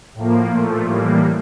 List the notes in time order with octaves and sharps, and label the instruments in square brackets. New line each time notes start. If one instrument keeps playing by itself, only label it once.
[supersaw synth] A2 F3 A#3
A#2 F3 A3
A2 E3 G3 A#3